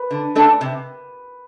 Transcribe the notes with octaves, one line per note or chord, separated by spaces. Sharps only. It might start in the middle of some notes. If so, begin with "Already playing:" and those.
Already playing: B4
D3
A3 D4 A4 D5
C3